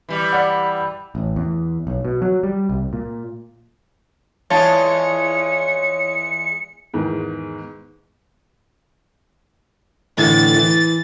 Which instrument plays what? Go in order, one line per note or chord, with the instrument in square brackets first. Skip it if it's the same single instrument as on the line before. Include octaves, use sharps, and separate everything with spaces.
[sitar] E3 G3
[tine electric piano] D5 F#5
[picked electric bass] A1
E2
B1
B2
F#3
G3
C2
A#2
[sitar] E2 G#3 F4 [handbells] C#5 [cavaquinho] A5 [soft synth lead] C#7
[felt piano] E2 G#2 D#3
[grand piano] A2 D3 E3 [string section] A6
[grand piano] E3